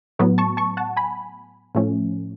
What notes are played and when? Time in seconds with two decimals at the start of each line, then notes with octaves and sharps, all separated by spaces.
0.19 A2 F#3 B3
0.38 A5 C#6
0.57 A5 C#6
0.77 F#5 A5
0.97 G#5 B5
1.75 A2 F3 A3 C#4